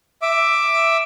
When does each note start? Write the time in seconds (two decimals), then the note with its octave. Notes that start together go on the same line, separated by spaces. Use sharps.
0.22 E5 D6